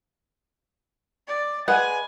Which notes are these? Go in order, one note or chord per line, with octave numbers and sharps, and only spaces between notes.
D5
G#3 B4 F#5 G#5